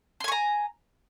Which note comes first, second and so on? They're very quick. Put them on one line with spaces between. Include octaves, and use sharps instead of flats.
C6 G#5 C#6 A#5